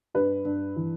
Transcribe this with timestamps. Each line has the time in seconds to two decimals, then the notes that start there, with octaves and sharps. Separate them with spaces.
0.14 G2 B4
0.45 G2
0.76 E3